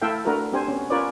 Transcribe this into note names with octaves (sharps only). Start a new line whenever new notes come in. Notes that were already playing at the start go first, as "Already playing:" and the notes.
A3 E4 A4 E5 F5 G5
A3 D4 F#4 A#4 B4
C4 D4 G4 C5 G#5
B3 C#4
C#4 F4 A#4 B4 C#5 D5